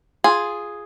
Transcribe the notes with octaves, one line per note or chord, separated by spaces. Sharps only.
F4 G#4